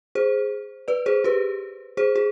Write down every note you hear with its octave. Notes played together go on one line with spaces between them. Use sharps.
G#4 C5
B4 D5
G#4 C5
G4 B4
G#4 C5
G#4